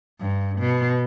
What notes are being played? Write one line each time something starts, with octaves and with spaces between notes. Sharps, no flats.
G2
B2